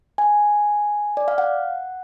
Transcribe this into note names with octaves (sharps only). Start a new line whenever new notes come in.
G#5
D5
F5
F#5